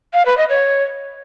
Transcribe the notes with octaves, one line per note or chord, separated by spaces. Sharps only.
F5
B4
D#5
C#5